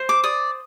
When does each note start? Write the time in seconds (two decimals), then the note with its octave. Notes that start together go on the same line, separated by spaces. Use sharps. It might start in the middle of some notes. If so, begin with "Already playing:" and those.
Already playing: C5
0.09 D6
0.24 D5 D#6